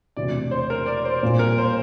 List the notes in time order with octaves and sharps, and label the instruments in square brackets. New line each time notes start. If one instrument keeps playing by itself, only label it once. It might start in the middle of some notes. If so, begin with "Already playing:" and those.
[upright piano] E1 D2 C3 E3 [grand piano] D5
[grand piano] C5
A#4
D5
C5
[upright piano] A#1 A#2 G3 C4
[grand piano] A#4
C5